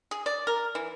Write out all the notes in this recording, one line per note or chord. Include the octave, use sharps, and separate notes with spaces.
G#4
D5
A#4
E3